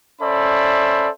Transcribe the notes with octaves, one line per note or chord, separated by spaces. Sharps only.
C#4 A4 C5 D5 E5 B5